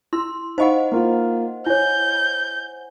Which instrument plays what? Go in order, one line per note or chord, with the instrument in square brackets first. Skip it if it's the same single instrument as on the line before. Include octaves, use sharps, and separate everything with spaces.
[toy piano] E4 [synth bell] C6 [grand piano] E6
[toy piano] D#4 [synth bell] C5 D#5 F#5 [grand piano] F5 B5 C#6
[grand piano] A#3 F4
[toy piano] E4 C#5 [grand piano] G#5 [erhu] G6